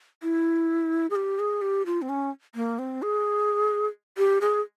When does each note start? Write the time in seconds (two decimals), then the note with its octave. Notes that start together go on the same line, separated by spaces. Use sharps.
0.23 E4
1.10 G#4
1.15 G4
1.39 G#4
1.62 G4
1.86 F4
2.02 C4
2.09 C#4
2.55 A#3
2.79 C4
3.02 G#4
4.18 G4
4.41 G#4